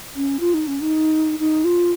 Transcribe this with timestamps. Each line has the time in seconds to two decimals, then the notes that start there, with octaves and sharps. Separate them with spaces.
0.15 C#4
0.40 F4
0.54 D#4
0.67 C#4
0.81 D#4
1.39 D#4
1.64 F4